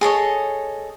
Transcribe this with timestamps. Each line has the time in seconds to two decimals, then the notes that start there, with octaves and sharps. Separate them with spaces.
0.01 G#4 A4 C#5 D#5